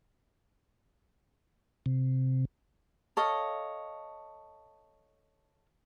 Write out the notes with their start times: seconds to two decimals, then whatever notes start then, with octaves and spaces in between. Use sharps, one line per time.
1.86 C3
3.17 A4 C#5 D#5 F5